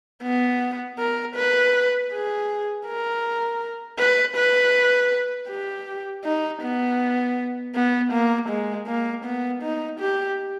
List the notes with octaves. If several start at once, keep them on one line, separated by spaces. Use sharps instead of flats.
B3
A#4
B4
G#4
A#4
B4
B4
G4
D#4
B3
B3
A#3
G#3
A#3
B3
D#4
G4